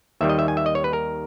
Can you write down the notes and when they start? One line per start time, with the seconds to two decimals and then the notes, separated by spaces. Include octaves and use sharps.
0.21 D#2 D#3 G3 E5
0.29 D#5
0.39 E5
0.48 G#5
0.57 E5
0.66 D#5
0.75 C#5
0.84 B4
0.93 A#4